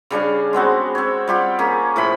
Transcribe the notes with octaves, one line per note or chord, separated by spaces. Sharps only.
C#3 G3 D4 F5
G#3 B3 C4 F#4
C4 C#5
G3 F4 G4 F#5
A#3 C#4 G#4
A2 F3 C5 B5